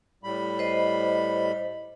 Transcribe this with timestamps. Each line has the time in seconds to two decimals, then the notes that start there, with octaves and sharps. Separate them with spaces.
0.24 A2 G3 B5
0.59 C5 D#5